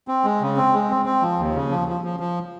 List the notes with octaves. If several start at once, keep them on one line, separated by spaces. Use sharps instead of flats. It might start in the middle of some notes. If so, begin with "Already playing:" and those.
C4
G#3
C#3
C4
G#3
C4
C4
F3
D#2
C#3
F3
F3
F3
F3